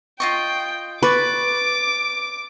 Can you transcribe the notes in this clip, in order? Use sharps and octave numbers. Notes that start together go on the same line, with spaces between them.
F4 D#5 G5 C#6
B4 D5 C#6 D6